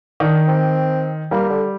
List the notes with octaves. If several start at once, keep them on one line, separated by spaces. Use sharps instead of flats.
D#3 D4
C4
G3 A#3
D3